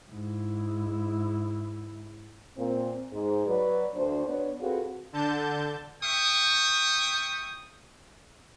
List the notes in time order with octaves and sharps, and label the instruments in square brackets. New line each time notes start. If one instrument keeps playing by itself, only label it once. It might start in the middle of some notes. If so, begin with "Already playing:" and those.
[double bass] G#2 E4
[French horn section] A#2 C4
G#2
F#3 B4 D5
D2 D4 C5
B3 D4 C#5 D5
C4 F4 F#4 G#4 A4 B4
[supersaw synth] D3 A5 G6
[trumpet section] E5 G5 C#6 D#6